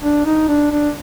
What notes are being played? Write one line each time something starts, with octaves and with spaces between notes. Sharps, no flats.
D4
D#4
D4
D4